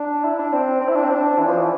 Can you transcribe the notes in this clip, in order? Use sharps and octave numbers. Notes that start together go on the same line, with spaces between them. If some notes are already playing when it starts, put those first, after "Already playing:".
Already playing: D4
E4
D4
C4
C4
E4
D4
C4
D4
E3
F3
E3